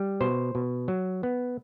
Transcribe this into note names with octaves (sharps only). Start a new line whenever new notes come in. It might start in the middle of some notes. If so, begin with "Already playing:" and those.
Already playing: G3
B2 C5
B2
F#3
B3